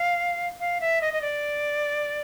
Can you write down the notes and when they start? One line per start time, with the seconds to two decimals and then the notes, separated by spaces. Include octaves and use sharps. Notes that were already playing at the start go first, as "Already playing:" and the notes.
Already playing: F5
0.60 F5
0.81 E5
1.01 D#5
1.13 D#5
1.22 D5